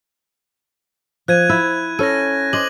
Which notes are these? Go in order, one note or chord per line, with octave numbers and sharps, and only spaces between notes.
F3 F#6 G#6 D#7
E4
C#4 A4 A#6 D#7
C5 D#5 D6 F#7